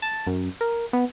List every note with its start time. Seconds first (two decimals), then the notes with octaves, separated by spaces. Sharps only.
0.02 A5
0.27 F#2
0.61 A#4
0.93 B3